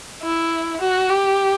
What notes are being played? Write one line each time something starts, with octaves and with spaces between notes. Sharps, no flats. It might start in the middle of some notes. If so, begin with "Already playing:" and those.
E4
F#4
G4